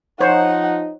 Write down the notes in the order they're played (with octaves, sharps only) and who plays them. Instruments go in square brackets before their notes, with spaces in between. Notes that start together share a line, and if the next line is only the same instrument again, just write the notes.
[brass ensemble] F3 D#4 [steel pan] C5 C#5 [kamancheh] F#5